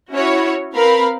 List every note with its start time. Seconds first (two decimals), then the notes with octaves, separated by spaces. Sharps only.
0.12 C#4 E4 F#4 C#5
0.74 C4 A#4 B4 F5 B5